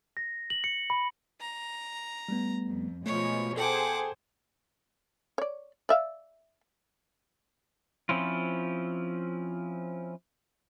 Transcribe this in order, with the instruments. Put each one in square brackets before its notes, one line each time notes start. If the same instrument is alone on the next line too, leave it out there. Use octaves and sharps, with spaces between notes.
[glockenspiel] A#6
F#7
C#7
B5
[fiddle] A#5
[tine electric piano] G3 A3 B3
[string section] F2
[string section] B2 F3 G#3 [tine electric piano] A3 [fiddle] C#5
[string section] G#4 C5 [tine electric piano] A4 G5 A5 [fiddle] F#5 D6
[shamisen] C#5 D5
D5 E5 F5
[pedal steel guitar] F3 C4 C#4 E4 F4